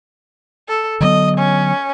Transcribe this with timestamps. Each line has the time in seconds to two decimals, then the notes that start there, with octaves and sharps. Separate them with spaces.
0.68 A4
1.00 D3 F#3 B3 D#5
1.37 C#4